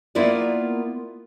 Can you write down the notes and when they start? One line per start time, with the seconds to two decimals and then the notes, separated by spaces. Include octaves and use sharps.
0.15 A#3 B3 E4 F4 A#4 D5